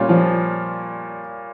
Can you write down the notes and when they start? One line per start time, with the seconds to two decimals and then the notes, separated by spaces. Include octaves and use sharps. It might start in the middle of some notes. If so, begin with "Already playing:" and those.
Already playing: A#2 G3 C#4 F4
0.09 F3